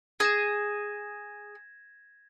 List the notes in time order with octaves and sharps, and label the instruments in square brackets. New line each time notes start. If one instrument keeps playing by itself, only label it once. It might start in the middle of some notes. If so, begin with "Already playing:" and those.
[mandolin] G#4 [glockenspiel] G#6 A#6 E7